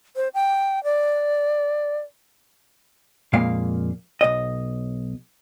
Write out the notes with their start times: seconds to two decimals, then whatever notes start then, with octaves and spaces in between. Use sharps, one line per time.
0.16 C5
0.34 G5
0.84 D5
3.33 F2 A#2 G#3 A#3 F5
4.21 B1 D#5